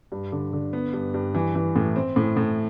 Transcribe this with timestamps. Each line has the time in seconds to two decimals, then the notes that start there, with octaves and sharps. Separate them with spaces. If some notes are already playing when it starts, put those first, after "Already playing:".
0.12 G2
0.32 D3
0.53 D3
0.73 B3
0.93 G2
1.14 G2
1.35 E3
1.55 E3
1.76 A2
1.96 C4
2.16 A2
2.37 A2